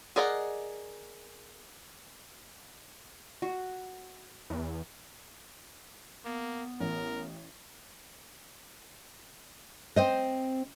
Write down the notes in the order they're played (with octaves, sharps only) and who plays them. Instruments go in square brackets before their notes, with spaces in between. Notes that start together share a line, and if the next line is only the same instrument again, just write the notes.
[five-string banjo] G#4 A#4 D5 D#5 F#5
[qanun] F#4
[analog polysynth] E2
[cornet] A#3 [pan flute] B3
[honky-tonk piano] A1 [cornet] A#4
[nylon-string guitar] C4 C5 D#5